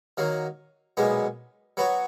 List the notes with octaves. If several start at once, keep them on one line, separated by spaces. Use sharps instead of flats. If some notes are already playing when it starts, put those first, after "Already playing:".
D#3 F#3 A#3
B1 A#2 G#3 B3
F#3 B3 F#4 C#5